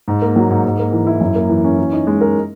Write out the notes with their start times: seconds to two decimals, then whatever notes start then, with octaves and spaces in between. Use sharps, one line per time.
0.08 G#2
0.22 A#3
0.36 F#3
0.50 G#2
0.65 G#2
0.79 A#3
0.92 E3
1.07 E4
1.21 F#2
1.35 A#3
1.49 E3
1.64 C#4
1.78 E3
1.93 D#4
2.07 G#3
2.21 A#4